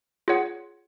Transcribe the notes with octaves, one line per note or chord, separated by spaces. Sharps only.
F4 G#4 C#5 F#5